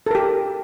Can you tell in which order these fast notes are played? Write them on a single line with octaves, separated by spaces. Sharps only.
A4 A#4 G4